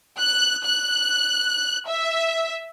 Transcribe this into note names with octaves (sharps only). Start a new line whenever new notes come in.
F#6
F#6
E5